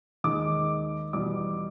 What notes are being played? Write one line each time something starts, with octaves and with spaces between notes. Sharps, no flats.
D#2 D#3 G#3 D6
E2 B2 G3 D6